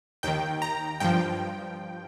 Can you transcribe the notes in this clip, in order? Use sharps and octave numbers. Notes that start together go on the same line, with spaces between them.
D#2 D#3 G5
A#5
G2 F3 G5